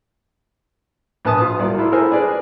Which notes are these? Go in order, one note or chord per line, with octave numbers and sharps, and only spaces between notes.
A#1 B4 A5 D#6
F4 B4
C2 F#3 D5
E4 F4
E4 A4 A#4 C5 G#5
D4 G#4 B4 D5